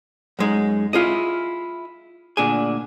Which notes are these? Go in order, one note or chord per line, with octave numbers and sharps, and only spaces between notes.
F#2 G#3 D#4
E4 F4 G#4 D#5
D2 A#2 D4 G#4 G#5